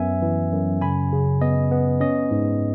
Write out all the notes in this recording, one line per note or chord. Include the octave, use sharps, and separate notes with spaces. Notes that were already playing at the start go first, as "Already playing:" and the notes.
Already playing: F#2 B3 E5 G#5
E3
F#2
C#3 G#5 B5
C#3
B3 D#5
B3
C#4 D#5
G#2